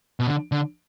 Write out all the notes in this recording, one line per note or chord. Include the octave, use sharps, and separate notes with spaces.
B2
D3
D3